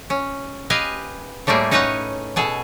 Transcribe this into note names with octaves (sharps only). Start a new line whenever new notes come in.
C#4
G4 B4 D#5 F5 G#5
A2 G3 A3 A#3 G#4
C#4 D#4 B4 C#5 D#5 F#5
B2 G#4 A4